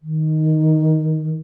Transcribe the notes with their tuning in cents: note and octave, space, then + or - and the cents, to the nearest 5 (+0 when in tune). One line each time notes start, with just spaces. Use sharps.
D#3 +5